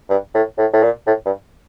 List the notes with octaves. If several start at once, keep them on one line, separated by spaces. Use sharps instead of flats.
G2
A2
A2
A2
A#2
A2
G2